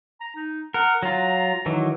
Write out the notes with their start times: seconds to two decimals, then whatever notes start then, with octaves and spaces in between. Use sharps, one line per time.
0.21 A#5
0.36 D#4
0.74 A#4 F#5
1.03 F#3 F4 A#5
1.66 D#3 E3 F#3